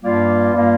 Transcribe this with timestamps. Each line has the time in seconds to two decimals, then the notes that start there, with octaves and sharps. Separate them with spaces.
0.03 G2 G3 A#3 F4
0.52 G2 G3 A#3 F4